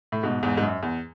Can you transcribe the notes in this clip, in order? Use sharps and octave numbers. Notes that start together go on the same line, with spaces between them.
A2
G#2 B2
E2 G#2
G#2
F#2
E2